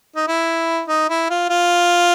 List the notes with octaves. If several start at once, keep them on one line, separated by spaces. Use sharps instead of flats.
D#4
E4
D#4
E4
F4
F4